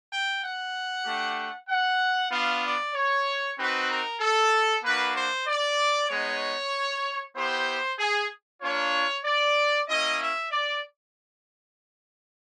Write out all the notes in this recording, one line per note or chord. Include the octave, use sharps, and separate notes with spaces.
G5
F#5
A3 D4 G4
F#5
B3 D4 F4 F5
D5
C#5
C4 D#4 F#4 B4
A#4
A4
A#3 D4 F#4 B4
C5
D5
G#3 B3 D#4 C#5
B3 E4 G4 C5
G#4
A#3 D4 F4 C#5
D5
A#3 C#4 E4 D#5
E5
D5